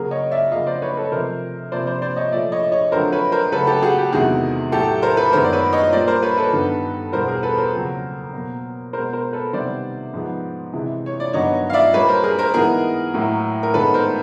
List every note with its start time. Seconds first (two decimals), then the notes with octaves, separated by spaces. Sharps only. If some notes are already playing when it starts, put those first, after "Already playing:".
Already playing: C#3 F#3 A#3 G#4 A#4
0.11 C#5 D#5
0.31 D5 E5
0.51 F2 C#3 F#3 A#3 D#5 F5
0.67 C5 D5
0.82 B4 C#5
0.97 A4 B4
1.12 C3 F3 A3 A#4 C5
1.72 C3 F3 A#3 C5 D5
1.87 C5 D5
2.02 C5 D5
2.16 C#5 D#5
2.32 A#2 F3 A3 D5 E5
2.52 C#5 D#5
2.72 C#5 D#5
2.92 F2 D3 F#3 A3 A#4 C5
3.12 B4 C#5
3.32 A#4 C5
3.52 C#3 F#3 A3 A4 B4
3.67 G4 A4
3.82 F#4 G#4
3.98 G4
4.12 E2 C3 D#3 G#3 B3 F#4 G#4
4.72 A2 F#3 A3 G4 A4
5.02 A#4 C5
5.17 A4 B4
5.33 F#2 D#3 G#3 B3 A#4 C5
5.44 D5
5.52 B4 C#5
5.73 C#5 D#5
5.93 A#2 G3 A#3 C5 D5
6.07 A#4 C5
6.22 B4 C#5
6.37 A4 B4
6.52 G2 D#3 G3 B3
7.13 E2 B2 G3 B3 A#4 C5
7.28 G#4 A#4
7.43 A4 B4
7.58 A#4 C5
7.73 F2 C#3 F#3 A#3
8.33 B2 F#3 A#3
8.93 B2 G#3 B3 A#4 C5
9.13 A#4 C5
9.33 A4 B4
9.53 C3 D#3 G3 B3 C5 D5
10.13 G#2 F3 G#3 B3
10.73 C3 E3 G#3
11.06 C#5
11.20 D5
11.33 G2 D#3 F#3 B3 C#5 D#5
11.70 F5
11.73 D5 E5
11.94 A#2 G3 A#3 B4 C#5
12.08 A#4 C5
12.23 G#4 A#4
12.39 A#4 C5
12.54 G#2 E3 G#3 B3 G#4 A#4
13.14 A2 F#3 A#3
13.63 A#4
13.74 G#2 D#3 G#3 B3 A4 B4
13.94 A#4 C5